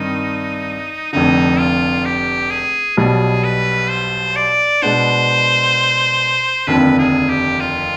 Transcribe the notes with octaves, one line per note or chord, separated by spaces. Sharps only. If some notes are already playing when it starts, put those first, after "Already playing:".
Already playing: G2 D#3 C4 D#4
F1 F2 D3 D#4
F4
G4
G#4
B1 B2 G3 G#4
B4
C5
D5
B2 G#3 B3 D4 C5
F1 D#2 D3 F3 C4 B4
G#4
G4
F4